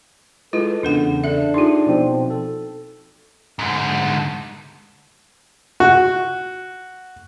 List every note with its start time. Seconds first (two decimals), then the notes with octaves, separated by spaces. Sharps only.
0.53 G#3 E4 F4 A4 B4
0.83 E2 C#3 D4 A#4 F#5
1.24 D4 A4 E5
1.54 D#4 F4 G4 G#4 D5
1.87 B2 F3 C4
2.30 A4
3.59 G#2 D3
5.80 F#4